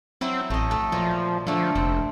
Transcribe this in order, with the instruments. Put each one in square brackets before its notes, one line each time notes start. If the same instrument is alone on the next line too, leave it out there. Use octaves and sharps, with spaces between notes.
[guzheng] F#3 E4 [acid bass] C4
[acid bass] A1 [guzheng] A3 D#5
[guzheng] A3
[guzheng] A#2 [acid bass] F3
[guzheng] D3 A3 [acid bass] F3
[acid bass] F1 [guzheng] C4